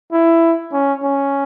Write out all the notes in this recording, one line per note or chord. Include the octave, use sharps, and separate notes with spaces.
E4
C#4
C#4